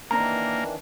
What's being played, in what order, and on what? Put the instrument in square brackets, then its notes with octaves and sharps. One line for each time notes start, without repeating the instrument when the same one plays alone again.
[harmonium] D#3 E3 D4 [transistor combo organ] A#3 [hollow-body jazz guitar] C4 A#5